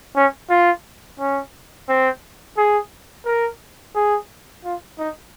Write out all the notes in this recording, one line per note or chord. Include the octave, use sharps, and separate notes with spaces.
C#4
F4
C#4
C4
G#4
A#4
G#4
F4
D#4